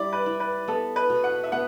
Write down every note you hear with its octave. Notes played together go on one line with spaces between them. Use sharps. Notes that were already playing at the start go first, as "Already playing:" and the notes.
Already playing: G3 E4 D5
B4
E4
B4
B3 A4
B4
B2
F#5
E5
B3 F#5